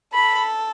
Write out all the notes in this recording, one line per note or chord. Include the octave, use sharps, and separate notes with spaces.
A4 B5